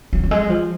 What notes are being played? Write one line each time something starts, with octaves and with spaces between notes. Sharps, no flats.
F#3
F#3
G#3
F3